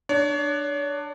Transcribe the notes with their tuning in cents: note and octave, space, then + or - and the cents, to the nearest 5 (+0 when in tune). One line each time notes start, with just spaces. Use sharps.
D4 +20 C#5 +40